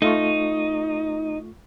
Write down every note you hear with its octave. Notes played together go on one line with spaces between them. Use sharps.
A3 D#4 F4 C#6